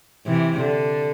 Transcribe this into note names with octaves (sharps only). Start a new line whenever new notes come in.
C3 E3
D3